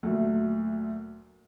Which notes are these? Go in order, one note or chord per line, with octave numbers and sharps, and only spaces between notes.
D2 A#2 F#3 A3